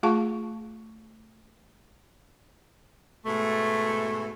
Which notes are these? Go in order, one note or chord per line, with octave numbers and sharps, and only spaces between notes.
A3 F4 G#4 F5 A5 C#6
G#2 B2 A3